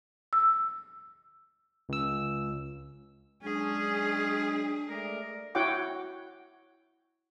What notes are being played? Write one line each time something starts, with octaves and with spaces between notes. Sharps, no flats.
E6
C#2 E6
F#3 G#3 C#4 D4 G#4
G#3 A3 A#4 D5
E4 F#4 C#5 F#5 G5 D6